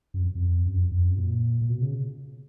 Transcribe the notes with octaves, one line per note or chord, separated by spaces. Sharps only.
F#2
F2
F2
F#2
F2
F2
F#2
A#2
A#2
B2
C#3